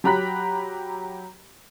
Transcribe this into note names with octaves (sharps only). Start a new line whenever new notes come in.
F#3 G4 A#5 B5 F#6 B6